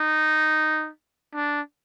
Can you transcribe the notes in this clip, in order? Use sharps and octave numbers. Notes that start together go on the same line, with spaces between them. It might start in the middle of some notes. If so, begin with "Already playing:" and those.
Already playing: D#4
D4